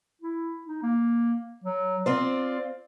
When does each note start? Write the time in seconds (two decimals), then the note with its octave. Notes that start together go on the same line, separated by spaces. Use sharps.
0.22 E4
0.67 D#4
0.83 A#3
1.64 F#3
2.06 C4 F4 C5 D5